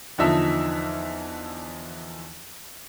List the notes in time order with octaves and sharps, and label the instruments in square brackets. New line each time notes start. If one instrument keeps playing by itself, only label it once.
[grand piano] E2 D3 F3 D#4 E5 A5